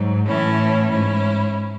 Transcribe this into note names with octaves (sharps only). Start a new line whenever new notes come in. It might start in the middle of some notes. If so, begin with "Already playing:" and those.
Already playing: G#2 F#3
A2 E3 A3 C#4 E4
G#2 G#3 C#4 E4